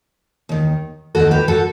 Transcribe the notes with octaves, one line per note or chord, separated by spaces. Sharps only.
D#2 D#3
D#2 D#3 F#4 A4
G4 B4
F#4 A4